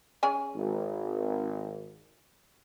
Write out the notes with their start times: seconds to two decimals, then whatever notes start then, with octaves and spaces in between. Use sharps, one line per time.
0.23 C#4 G#4 G#5
0.55 G#1